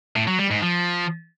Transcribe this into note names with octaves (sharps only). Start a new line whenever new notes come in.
A2
F#3
G3
G#2
F3